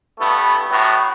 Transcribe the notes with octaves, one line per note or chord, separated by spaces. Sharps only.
G2 A3 B3 E4
A2 F#3 B3